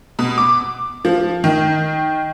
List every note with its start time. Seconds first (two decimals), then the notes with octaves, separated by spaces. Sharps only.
0.19 B2
0.38 D6
1.05 F3
1.44 D#3